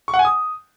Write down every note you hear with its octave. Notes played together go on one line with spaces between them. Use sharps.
C#6
F#5
G#5
D#6